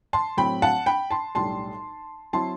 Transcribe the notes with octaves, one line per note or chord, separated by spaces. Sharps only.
A5 C6
A2 F#3 C4 G5 B5
F#5 A5
G5 B5
A5 C6
B1 A2 G3 D4 A5 C6
F#3 C4 E4 A5 C6